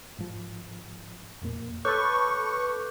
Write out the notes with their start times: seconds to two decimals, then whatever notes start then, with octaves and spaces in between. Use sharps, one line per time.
0.19 G#2 F3
1.42 F2 A#2 A#3
1.85 A4 B4 C#5 C#6 D6 F#6 G6